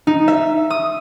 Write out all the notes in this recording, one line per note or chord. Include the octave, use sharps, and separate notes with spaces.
D#4
E5
D#6